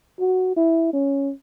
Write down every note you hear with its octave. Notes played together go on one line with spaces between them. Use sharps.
F#4
E4
C#4